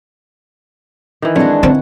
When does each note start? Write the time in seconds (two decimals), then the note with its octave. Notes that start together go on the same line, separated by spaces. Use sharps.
1.22 D#3 E3
1.36 F2 G#3 D4 C#5 F#5
1.63 D3 C4 C#4 F#5